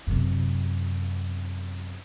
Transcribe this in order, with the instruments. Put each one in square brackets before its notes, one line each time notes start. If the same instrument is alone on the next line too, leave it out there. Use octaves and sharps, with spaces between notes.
[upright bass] F#2 C3